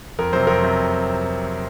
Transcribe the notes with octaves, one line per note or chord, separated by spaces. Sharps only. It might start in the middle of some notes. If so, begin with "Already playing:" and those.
F2 A#4
C3 F#3 C5
F2 A#4
C3 F#3